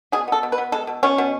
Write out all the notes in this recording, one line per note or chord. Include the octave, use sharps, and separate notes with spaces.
B2 G#4
B3 A4
B2
B4
B3
G#3 A4
B2
B2 C#4
B2